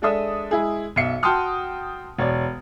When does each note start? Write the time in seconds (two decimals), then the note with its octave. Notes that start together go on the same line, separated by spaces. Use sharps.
0.02 G#3 D4 A4 E5 D#6
0.51 G#3 E4 G#4
0.96 B1 E5 C#7
1.23 F#4 G5 A5 C6 D#6 F6
2.18 E1 C#5 D5